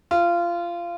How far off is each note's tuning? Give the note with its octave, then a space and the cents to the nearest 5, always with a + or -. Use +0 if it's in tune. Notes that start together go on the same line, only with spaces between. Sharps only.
F4 -20